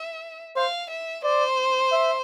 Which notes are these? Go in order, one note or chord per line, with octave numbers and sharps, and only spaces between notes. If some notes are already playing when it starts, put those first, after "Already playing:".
Already playing: E5
C5 F5
E5
C5 D5
E5